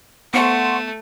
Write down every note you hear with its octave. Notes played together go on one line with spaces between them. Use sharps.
A3 B3 C5 F#5 C6 C#6